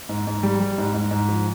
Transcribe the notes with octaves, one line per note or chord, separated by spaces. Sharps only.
G#2
G#2
G3
G3
G#2
G#2
G#2
F3